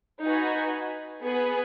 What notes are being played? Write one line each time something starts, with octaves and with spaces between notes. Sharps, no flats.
D#4 F#4 B4 G#5
B3 G#4 B4